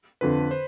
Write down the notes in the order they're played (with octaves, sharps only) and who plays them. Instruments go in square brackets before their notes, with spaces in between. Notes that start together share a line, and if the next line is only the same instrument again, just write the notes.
[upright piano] F2 D3 [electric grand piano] B4
[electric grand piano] C5